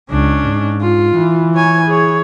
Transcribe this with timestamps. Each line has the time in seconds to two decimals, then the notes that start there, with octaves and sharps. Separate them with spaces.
0.11 C#2 C#4 D4
0.46 G#2
0.81 F4
1.16 E3
1.55 C#5 G#5
1.86 G#4 C#5